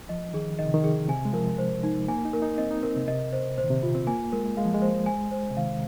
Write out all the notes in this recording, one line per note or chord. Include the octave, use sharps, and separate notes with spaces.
F3 D#5
D#3 G#4
D#3 D#5
C3
D#3
G#4
C3 G#5
G#3
F3 A#4
C5
D#4
A#3 G#5
D#4
A#4
D#4
C4 D#5
D#4
C4 A#4
C3
C3 D#5
C5
A#2 C5
D#3
C3
C4 F4
C4
A#3 G#5
G#3 A#4
G#3 F5
F3
G#3
C5
G#5
C5
C3
D#3 F5